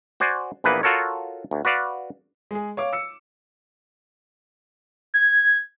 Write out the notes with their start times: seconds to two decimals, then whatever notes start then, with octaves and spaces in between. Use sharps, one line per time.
0.20 F#4 C5 D5 G#5
0.64 A#1 E3 A#3 B3 B4
0.83 F4 F#4 A4 A#4 C#5
1.51 D2
1.65 F#4 B4 D5 F5
2.51 G#3 G#4
2.77 C#5 F5 D6
2.93 E6 C#7
5.14 G#6